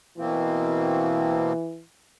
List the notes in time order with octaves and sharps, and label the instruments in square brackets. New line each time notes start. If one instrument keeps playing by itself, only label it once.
[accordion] B2 A#3 C4 [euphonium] E3